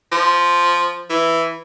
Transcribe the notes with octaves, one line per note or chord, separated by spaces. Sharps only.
F3
E3